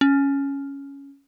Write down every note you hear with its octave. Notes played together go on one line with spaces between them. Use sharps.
C#4